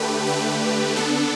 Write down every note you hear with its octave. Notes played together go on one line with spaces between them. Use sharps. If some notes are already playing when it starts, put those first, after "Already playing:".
Already playing: D3 A3 G4 B4
D3 A3 G4 B4
D3 B3 D4 A4